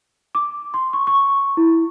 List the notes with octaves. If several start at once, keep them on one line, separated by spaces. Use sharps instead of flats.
D6
C6
C#6
C#6
E4